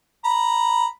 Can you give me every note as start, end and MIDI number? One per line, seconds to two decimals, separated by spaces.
0.25 0.86 82
0.25 0.86 83